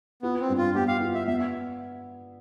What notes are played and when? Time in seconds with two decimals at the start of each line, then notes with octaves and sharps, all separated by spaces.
0.22 B3 F4
0.40 C4
0.49 G2
0.58 F4
0.75 B3 G4
0.88 F5
1.01 F4
1.15 E5
1.27 B3 E5